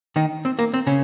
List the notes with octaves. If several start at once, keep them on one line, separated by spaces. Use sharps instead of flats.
D#3 D#4
C4
A#3
C4
C#3 C#4